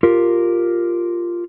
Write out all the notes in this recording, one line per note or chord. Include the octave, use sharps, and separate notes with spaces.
F4 G4 A#4